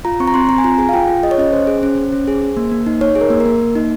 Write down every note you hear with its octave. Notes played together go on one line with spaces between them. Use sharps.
F4 A#5
C4 C#6
A#5
C4 C6
C4 A#5
G#5
F4 A#5
G#4 G#5
F5
F4 G5
F4
G#4 D#5
C#5
C#4 D#5
C#4 C5
G#4
C#4
C#4
C#4
G#4
G#4
A#3
A#3
D#4
D#4 C#5
G#4
A#4
A#3
A#4
A#3
A#3
D#4